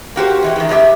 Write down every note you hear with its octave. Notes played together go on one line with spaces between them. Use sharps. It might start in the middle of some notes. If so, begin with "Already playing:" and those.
A#3 F#4 G4 C5
E3 G3 G#3
D#3 E3
A2 G#3 G4 E5